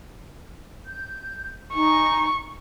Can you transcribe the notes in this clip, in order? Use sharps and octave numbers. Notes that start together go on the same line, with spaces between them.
G6
D#4 G#5 C#6